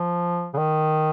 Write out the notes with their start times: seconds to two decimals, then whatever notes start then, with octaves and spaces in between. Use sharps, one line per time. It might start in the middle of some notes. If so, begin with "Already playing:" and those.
Already playing: F3
0.54 C#3
0.57 D#3